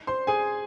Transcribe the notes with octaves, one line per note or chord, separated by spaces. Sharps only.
C5 C6
G#4 G#5